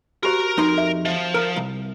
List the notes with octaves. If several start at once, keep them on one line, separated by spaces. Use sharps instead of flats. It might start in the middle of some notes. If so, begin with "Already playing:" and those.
F#4 G4 A#4 C5 A#5
F2 D#4 C6
E5
F3 E5
A#4
C2